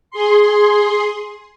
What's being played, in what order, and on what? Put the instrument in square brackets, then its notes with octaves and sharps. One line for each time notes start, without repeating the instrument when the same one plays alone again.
[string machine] G#4 C6